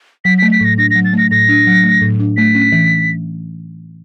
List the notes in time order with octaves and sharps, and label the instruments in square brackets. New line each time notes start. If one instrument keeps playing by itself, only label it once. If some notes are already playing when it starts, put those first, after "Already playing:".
[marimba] F#3 [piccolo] B6
[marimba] A3 [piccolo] B6
[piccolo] B6
[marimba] A2 [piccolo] A#6
[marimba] D4 [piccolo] A#6
[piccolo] A#6
[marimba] F#3
[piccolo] A6
[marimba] A3 [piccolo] A#6
[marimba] A2 [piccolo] A#6
[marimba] D4
F#3
A3
A2
D4
[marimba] A3 [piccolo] B6
[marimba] C#4
E3